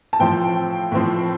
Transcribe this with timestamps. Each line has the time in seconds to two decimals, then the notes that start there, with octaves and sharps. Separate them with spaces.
0.13 A5
0.20 A2 F3 C4 G5
0.92 A2 F3 C4